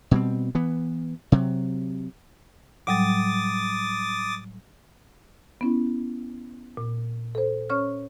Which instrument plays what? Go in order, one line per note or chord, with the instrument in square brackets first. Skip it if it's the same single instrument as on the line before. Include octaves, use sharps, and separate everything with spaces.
[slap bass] B2 G3 C4
E3 B3
C3 F#3
[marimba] A2 F#3 G3 [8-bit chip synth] D6 D#6 A6
[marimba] B3 C#4 E4
A#2
A4 C5
C#4 C#5 C#6 F6